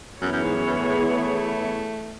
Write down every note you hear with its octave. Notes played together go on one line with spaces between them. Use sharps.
F#2 E3 B3 E4 G#4 C#5
F#2
G#2
F#2
F#2
A2
A2
G#3
A3